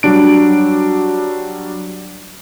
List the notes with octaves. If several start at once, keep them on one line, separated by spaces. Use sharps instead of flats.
F#3 G3 D4 D7